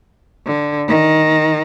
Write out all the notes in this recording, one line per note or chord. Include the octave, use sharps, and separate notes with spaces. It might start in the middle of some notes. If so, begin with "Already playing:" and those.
D3
D#3